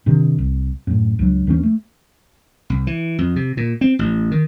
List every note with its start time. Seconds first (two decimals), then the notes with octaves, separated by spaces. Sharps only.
0.06 G2 C3 D#3
0.39 C2
0.87 F#2 A2
1.19 C#2 G2 F#3
1.47 D#2 E3 G#3 C#4
1.63 A3
2.70 C2
2.87 E3
3.18 F2
3.36 C3
3.57 A#2
3.81 C4
3.99 A1
4.31 D#3